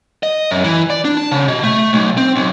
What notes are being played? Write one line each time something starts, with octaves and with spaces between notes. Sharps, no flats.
D#5
F#2
E3
D5
D4
A5
C#3
B2
A3
B1
C4
B1